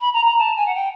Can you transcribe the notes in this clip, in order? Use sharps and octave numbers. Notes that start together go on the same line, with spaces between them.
B5
A#5
A#5
A5
G#5
F#5
G5